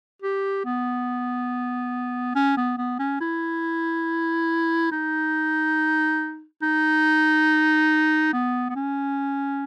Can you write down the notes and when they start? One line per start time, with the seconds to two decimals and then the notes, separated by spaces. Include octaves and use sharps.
0.22 G4
0.65 B3
2.35 C#4
2.57 B3
2.78 B3
2.99 C#4
3.21 E4
4.91 D#4
6.62 D#4
8.33 B3
8.70 B3
8.76 C#4